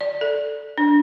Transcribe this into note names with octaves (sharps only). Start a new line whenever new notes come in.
D5
A4
D4